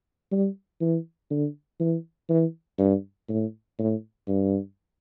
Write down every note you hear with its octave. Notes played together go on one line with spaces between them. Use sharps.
G3
E3
D3
E3
E3
G2
A2
A2
G2